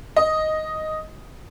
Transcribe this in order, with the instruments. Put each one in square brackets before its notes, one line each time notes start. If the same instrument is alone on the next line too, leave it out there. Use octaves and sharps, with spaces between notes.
[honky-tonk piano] D#5